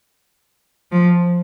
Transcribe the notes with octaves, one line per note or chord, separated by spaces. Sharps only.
F3